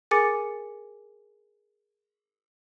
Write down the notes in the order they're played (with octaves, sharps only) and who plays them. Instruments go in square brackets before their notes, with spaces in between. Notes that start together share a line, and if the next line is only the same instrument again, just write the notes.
[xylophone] G#4 A#4 G#5 D6 A6 C#7